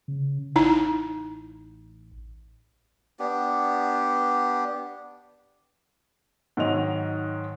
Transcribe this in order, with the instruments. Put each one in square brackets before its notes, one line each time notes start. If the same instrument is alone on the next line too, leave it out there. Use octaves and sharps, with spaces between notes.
[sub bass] C#3
[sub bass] A1 [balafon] D#4 E4
[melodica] B3 D4 G4
[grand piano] G#2 D#3 F#3 D#4 D#5 F7